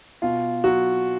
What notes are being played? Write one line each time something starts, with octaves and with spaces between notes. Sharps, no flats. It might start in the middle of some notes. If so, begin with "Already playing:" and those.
B2 F4
F#3 F#4